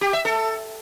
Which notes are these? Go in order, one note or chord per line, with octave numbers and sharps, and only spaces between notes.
G4
E5
A4